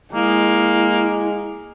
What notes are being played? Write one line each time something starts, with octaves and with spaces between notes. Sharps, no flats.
G#3 A#3 E4